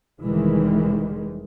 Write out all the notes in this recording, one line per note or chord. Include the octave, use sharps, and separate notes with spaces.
F1 D#3 E3 G3 G#3